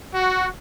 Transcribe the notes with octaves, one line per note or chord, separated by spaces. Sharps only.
F#4